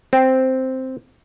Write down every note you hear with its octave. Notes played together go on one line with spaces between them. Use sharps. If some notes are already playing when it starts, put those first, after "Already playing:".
C4